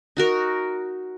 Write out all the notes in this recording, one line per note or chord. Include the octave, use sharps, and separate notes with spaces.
D#4 F#4 A#4